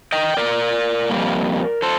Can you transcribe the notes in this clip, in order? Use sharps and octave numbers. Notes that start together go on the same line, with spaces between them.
D#5 G5
A#4 D5
F2 C3 G3 A#3
A4 C5